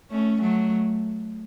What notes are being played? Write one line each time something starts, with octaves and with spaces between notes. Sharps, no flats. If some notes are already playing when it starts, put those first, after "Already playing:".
A3 C#4
F#3 A3